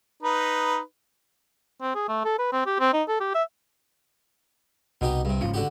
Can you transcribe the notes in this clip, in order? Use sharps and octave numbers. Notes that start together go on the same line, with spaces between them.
D#4 B4
C4
G#4
A3
A4
B4
C4
G4
C4
D#4
A4
G4
E5
C2 B2 D#4 G4
G2 C3
F#1 G#2 F3 C#4
D3 F#4 G4